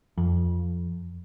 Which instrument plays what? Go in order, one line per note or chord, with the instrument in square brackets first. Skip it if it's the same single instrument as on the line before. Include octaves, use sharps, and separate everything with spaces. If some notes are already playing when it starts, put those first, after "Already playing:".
[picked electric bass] F2